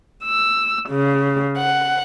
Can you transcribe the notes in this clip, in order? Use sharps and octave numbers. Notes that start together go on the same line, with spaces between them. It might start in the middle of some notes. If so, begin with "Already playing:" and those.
E6
C#3
F#5